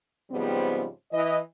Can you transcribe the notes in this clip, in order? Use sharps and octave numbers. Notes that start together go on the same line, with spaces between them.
G#2 C#3 F3 G3 B3 C4
E3 D#5